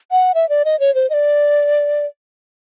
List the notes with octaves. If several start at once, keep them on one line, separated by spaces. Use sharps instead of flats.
F#5
E5
D5
D#5
C#5
C5
D#5
D5